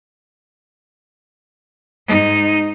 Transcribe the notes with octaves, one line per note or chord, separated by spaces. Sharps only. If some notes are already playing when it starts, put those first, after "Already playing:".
G#2 D#4